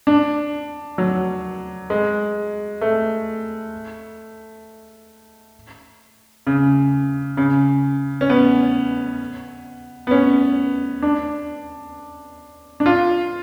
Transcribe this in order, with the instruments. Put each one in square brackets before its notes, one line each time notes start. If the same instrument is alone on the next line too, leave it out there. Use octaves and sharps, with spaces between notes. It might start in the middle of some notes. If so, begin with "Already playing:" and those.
[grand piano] D4
F#3
G#3
A3
C#3
C#3
C#4
B3
B3
C#4
D4
D4
F4